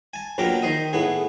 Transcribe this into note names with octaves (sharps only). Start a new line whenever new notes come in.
G#5 A5
A#1 B2 F#3 A#4 G5 D6
D#3 C5 D#5 D#6
A2 B3 G#4